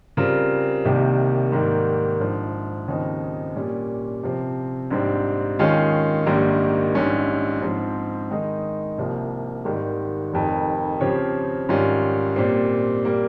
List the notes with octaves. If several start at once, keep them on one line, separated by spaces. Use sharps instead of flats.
C#3 G3 C4 F4 A#4
C2 C3 D#3 G3 A#3
G#2 D#3 G3 A#3
A#1 G#2 F3
D#2 C#3 F3 C4 D#4
A#2 G3 C#4
C3 F3 C4
A#1 G#2 G3 C4
D#2 D#3 G#3 C#4 F4
A#1 G#2 D#3 G3 A#3
A#1 G#2 G3 C#4
G#2 F3 C4
D#3 G#3 D#4
C2 C3 F3 A#3
G#1 G#2 D#3 G3
F1 F2 D#3
C#3 F3 C4 G4 C#5
G#2 D#3 G3 C#4 F4
A#2 G3 C4
A#2 G3 A#3